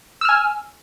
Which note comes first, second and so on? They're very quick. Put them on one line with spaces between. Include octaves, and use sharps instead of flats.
E6 F6 G#5